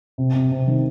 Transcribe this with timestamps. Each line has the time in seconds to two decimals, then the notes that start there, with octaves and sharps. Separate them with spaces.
0.18 C3
0.35 C3
0.51 C3
0.67 D#3